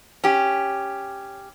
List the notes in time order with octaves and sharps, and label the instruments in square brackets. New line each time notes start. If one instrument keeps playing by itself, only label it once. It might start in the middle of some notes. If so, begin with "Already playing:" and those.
[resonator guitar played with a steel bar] C#4 G4